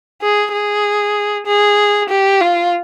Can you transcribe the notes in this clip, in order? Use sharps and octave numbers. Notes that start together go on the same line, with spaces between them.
G#4
G#4
G#4
G4
F4